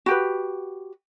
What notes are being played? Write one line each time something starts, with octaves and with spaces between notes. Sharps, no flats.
F#4 G4 B4